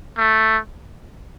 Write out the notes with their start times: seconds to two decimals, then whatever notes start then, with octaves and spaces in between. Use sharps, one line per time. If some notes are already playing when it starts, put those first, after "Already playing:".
0.18 A3